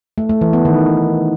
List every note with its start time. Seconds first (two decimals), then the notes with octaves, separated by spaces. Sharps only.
0.18 A3
0.29 A3
0.41 E3
0.53 B3
0.65 D#3